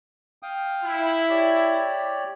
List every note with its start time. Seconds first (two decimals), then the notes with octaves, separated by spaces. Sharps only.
0.43 F5 G5 D#6
0.84 E4
1.29 G4 C#5 D5